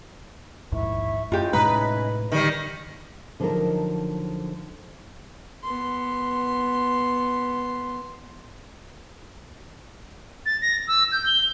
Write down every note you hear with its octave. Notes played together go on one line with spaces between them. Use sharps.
A#1 D#2 G#2 E4 E5 C#6
F#2 C#4 E4 F4 G4 D#5
A2 C3 G#3 D#4 B4
D3 D#3 G3 D#5
D3 F3 F#3 D#4 A4 A#4
B3 C6
A6
A#6
E6
G6
G7